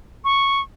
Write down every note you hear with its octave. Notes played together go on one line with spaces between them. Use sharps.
C#6